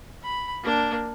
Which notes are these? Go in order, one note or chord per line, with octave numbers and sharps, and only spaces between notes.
B5
A#3 D4